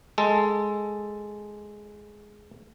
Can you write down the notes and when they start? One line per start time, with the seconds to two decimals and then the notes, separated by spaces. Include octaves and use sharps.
0.18 G#3 A4